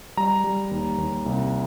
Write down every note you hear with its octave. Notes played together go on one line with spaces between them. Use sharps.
G3 A#5
G3
D#2
D#2
C2